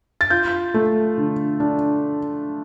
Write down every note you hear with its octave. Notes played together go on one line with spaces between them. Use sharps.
A6
F4 G6
A3
D3
D4